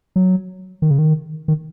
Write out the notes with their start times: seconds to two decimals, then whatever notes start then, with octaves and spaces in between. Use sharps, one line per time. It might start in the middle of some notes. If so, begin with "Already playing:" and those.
0.16 F#3
0.82 D#3
0.91 C#3
0.99 D#3
1.48 D#3